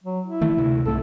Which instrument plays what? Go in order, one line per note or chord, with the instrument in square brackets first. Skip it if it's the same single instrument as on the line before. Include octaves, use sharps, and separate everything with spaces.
[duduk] F#3
E4
[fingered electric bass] D#3 E3 A3
D2 C3
[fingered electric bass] C2 G#2 A3 [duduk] A4